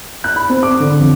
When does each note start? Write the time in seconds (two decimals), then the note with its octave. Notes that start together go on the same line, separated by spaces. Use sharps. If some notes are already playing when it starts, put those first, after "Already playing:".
0.24 F#6
0.36 B5
0.49 C4
0.63 D6
0.80 D3
0.99 F2